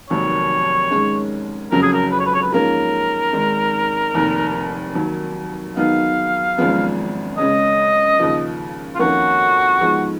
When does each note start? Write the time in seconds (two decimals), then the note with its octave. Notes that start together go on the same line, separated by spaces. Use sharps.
0.10 F1 D#2 D#3 F#3 C#5
0.91 G#2 D#3 G#3 C#4
1.71 F#1 F2 C#3 F#3 C#4 A#4
1.82 G#4
1.93 A#4
2.12 B4
2.19 C#5
2.26 B4
2.34 C#5
2.42 B4
2.52 G#2 F3 A#3 C#4 A#4
3.33 G#1 G#2 D#3 G#3
4.14 F1 D#2 D#3
4.95 D#2 D#3 F#3
5.76 G#2 D#3 F#3 B3 D#4 F5
6.57 G#1 F#2 F3 G#3 B3
7.38 C#2 C#3 G#3 C#4 D#5
8.19 D#2 C#3 F3
8.95 F4
8.99 F2 D#3 A#3 C#4 F#4
9.81 G#2 F3 G#3 B3